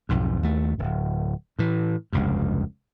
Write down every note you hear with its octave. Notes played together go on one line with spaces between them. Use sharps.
B1 F2 G#2
D#2 A3
D1
A2 E3
F1 C#2 G2